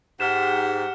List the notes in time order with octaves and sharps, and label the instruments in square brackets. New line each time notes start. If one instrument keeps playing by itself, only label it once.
[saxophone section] G#2 [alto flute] G4 [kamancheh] F#5 [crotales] F6 B6 E7